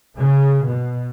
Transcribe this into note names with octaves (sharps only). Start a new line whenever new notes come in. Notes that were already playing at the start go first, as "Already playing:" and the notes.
C#3
B2